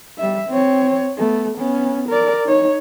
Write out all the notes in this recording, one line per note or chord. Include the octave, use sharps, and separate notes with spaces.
G3 E5
C4 C#5
A3 B3
B3 C#4
A#4 D5
D#4 C#5